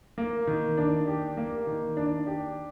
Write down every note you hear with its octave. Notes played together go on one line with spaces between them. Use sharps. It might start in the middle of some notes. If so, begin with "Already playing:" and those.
A#3
D#3
D4
G4
A#3
D#3
D4
G4